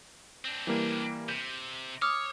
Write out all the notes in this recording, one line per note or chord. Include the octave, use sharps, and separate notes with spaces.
C4 D4
E3 G3 A#3
C3 G6
C#5 D6 D#6 F6